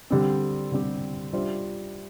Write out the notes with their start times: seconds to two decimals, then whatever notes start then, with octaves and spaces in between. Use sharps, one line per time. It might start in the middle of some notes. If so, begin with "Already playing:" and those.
0.10 D3 G3 C4 G4
0.72 D3 G3 C4 G4
1.33 G3 D4 F4 C5 E5